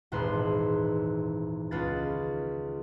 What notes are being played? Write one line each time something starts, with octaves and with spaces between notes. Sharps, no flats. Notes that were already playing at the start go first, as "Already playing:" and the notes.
D#1 G#1 E2 B4 C6
C#2 F4 B4 A6